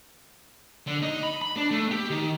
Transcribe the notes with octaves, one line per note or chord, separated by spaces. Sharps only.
D3
D#4
B5
B5
D4
A3
G4
D#3